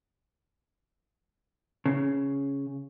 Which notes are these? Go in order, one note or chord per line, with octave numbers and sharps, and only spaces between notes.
C#3